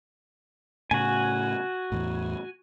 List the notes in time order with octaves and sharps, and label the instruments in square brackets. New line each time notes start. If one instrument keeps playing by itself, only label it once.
[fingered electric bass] A2 C#3 [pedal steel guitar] F#4 G#5
[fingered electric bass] E2 A2